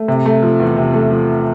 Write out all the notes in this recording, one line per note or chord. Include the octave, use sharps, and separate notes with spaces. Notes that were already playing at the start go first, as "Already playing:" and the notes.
Already playing: A3
C3
A3
F3
E2
C3
A3
F3